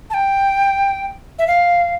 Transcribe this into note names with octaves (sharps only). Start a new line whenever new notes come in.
A5
G5
E5
F5